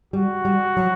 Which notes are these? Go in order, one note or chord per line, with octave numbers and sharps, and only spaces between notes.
G3 F#4
G3
F#3